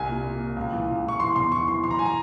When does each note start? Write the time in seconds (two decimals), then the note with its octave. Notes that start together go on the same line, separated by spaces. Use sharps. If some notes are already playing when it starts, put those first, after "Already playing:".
Already playing: C2 G#5
0.09 A#2
0.24 A#2
0.40 A#2
0.56 C#2
0.72 E3
0.88 C#2
1.05 C#2 C#6
1.20 E3 C6
1.36 E2 C6
1.52 E3 C#6
1.68 E3 C6
1.84 E3 C6
1.91 A#5
1.99 E3 G#5
2.06 A#5